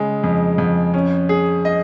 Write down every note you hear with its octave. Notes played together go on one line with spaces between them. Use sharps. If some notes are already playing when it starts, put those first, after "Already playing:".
Already playing: C#3 G#3
F2
F2
C#4
G#4
D#5